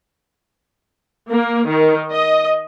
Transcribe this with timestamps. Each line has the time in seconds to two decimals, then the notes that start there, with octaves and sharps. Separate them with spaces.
1.30 A#3
1.68 D#3
2.12 D#5